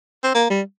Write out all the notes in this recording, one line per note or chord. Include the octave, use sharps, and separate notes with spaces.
C4
A#3
G3